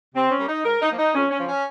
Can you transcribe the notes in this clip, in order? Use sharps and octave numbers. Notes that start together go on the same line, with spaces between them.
C3 C4
C#4
G3 A#3
D#4
G#2 A#4
D#4
F3 A#3
D#4
F2 C#4
C#4
C#3 F3
C#4